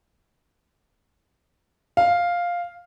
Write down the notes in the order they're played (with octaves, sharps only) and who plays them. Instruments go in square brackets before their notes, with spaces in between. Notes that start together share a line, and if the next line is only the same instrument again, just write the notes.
[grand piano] F5